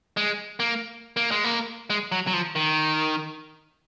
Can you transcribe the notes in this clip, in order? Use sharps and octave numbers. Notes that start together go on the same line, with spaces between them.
G#3
A#3
A#3
G#3
A#3
G#3
F#3
F#3
F3
D#3